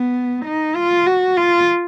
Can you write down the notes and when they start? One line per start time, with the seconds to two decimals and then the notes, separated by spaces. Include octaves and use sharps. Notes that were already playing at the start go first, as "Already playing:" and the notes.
Already playing: B3
0.45 D#4
0.75 F4
1.06 F#4
1.37 F4